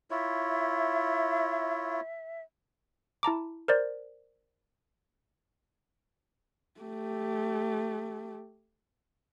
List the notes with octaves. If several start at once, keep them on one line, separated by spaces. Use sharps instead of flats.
E4 F4 C#5 E5
E4 A5 A#5 D6
A#4 C5 D5
A3 G4